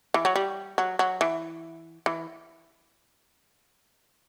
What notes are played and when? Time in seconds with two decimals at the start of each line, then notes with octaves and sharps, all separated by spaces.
0.14 E3
0.25 F#3
0.36 G3
0.78 F#3
0.99 F#3
1.21 E3
2.06 E3